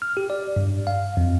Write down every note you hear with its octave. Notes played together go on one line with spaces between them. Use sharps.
F6
G4
D5
G2
F5
F2